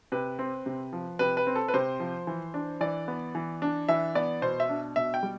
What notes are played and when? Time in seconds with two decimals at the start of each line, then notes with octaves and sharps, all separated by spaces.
0.12 C3 B4
0.39 C4
0.66 C3
0.93 F3
1.19 C3 B4
1.37 B4
1.47 C4
1.55 A4
1.68 B4
1.74 C3 C5
2.00 F3
2.27 E3
2.54 D4
2.81 E3 D5
3.08 B3
3.35 E3
3.62 D4
3.88 E3 E5
4.15 B3 D5
4.42 B2 C5
4.60 E5
4.69 D4
4.96 B2 E5
5.14 G5
5.23 G3